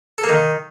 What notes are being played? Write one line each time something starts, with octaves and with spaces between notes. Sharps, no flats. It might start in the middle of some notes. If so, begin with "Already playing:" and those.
A4
A#3
D#3